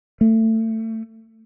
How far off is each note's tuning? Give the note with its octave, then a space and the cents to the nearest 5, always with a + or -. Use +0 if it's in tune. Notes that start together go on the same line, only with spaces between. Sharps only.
A3 +25